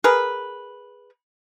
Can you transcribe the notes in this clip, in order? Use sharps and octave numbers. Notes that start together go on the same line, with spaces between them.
G#4 A#4 B4